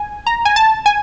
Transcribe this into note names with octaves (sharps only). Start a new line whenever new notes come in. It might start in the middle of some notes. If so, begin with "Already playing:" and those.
Already playing: G#5
A#5
G#5
A5
G#5